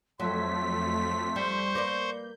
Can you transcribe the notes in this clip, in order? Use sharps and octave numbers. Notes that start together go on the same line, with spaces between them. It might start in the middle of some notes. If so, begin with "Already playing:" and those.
F2 F#3 A3 C6 B6
G3 C5 C#6 G6
A#3 B4 D5